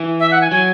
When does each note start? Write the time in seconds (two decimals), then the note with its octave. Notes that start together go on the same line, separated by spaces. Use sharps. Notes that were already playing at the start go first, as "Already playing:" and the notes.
Already playing: E3
0.20 E5
0.31 F#5
0.41 G#5
0.51 F#3 G#5